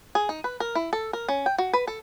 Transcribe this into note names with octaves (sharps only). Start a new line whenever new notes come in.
G#4
D#4
B4
A#4
E4
A4
A#4
C#4
G5
F#4
B4
A4